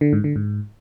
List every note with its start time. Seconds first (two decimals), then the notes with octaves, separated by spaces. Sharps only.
0.01 D3
0.13 G#2
0.24 D3
0.36 G#2